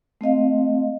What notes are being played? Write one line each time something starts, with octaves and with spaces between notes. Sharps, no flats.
A3 C4 D#5 F5